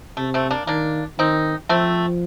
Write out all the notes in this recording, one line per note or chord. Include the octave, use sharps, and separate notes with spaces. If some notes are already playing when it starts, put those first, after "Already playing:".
C3 A3
A3 C4
A#3 D4
D#3 A#3 D4
D#3 C4 D#4
F3 A3 C4